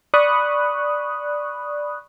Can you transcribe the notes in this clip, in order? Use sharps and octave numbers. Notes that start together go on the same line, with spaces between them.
D5 B5 C#6 D#6 F#6